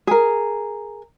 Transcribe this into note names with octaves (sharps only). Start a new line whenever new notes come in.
G#4 A#4